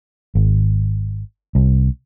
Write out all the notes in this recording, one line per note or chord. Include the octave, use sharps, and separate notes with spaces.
G#1
C2